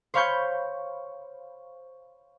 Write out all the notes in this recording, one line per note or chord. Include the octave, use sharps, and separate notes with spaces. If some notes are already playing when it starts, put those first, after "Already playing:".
C5 C#5 F5 B5 C#6 G6